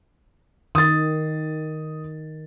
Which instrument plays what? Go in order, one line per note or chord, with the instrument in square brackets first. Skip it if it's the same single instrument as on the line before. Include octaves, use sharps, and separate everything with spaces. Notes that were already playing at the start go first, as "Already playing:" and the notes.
[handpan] D#3 [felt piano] D#6 A6